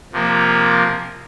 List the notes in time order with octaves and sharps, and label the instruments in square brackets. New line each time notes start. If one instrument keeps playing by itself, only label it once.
[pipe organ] C3 F3 A#3